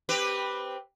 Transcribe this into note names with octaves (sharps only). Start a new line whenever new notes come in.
C4 G4 B4